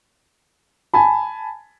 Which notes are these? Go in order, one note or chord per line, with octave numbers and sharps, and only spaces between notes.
G#5 A5 B5